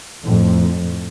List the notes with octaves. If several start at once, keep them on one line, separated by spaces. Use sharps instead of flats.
F2 A2